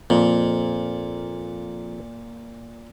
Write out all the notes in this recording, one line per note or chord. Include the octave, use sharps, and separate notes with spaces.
F2 A#2